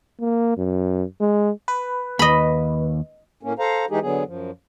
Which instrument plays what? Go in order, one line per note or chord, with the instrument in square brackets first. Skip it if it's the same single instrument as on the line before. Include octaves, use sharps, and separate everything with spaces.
[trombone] A#3
F#2
G#3
[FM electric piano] B4
[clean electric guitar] D#2 [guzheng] D#5 B5
[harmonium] A2 A#3 C#4
A4 C5 F5 A#5
E3 G#3 D#4 G4 G#4
D3 F#3 B3 G#4
F#2 F3